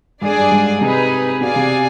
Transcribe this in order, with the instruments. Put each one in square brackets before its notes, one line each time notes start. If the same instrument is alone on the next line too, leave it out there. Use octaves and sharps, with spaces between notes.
[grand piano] G#2 [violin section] D4 G#4 D5 G#5
[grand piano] G2
G#2
[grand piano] C3 [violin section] D#4 G#4 B4
[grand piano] B2 [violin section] G#4 D5 F5 G#5
[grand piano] C3